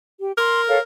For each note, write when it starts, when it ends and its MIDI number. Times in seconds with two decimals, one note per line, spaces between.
0.19 0.31 67
0.38 0.82 70
0.38 0.60 84
0.67 0.78 69
0.67 0.78 73
0.67 0.78 77